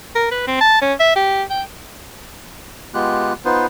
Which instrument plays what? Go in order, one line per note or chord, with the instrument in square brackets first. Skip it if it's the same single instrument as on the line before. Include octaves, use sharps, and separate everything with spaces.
[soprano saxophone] A#4
B4
C4
A5
C#4
E5
G4
G5
[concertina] G#3 B3 F4 G4 F#6
B3 D#4 F4 B4 C5